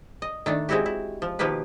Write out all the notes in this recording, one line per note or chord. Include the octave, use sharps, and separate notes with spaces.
D#5
D#3 A3 D4
G#3 C4 E4 F#4 G4
E4
F3
B2 D#3 F3 A#3 G4 B4